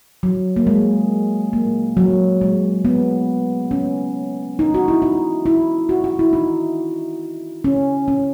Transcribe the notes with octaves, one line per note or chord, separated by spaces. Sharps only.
F#3
A#3
G#3
A#3
F#3
G#3
B3
C#4
D#4
F#4
E4
D#4
E4
F#4
F#4
E4
D#4
C#4
C#4